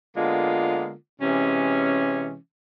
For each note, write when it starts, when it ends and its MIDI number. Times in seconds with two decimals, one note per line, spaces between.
0.15 0.93 50
0.15 0.93 56
0.15 0.93 58
0.15 0.93 59
0.15 0.93 65
1.20 2.35 48
1.20 2.35 52
1.20 2.35 56
1.20 2.35 61